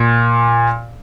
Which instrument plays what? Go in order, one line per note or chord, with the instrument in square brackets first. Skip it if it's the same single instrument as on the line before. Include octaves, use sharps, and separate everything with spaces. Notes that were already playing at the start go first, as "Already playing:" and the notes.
Already playing: [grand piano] A#2